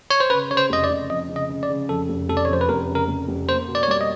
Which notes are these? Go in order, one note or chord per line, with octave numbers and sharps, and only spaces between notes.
C#5
C5
C#3 B4
C#3 C#5
C5
F1 D#5
D5
F1
F2 D#5
C#3
D#5
C#3
D5
C#3
F2 A4
F1
F1 A4
D5
C#5
F2 C5
B4
F1 A#4
C#3
A#4
F1
F1
A#3 C5
B2
D5
C#5
G3 D5
D#5